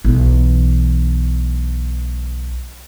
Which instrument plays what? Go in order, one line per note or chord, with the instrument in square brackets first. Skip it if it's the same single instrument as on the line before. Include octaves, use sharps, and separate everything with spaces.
[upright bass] B1 E3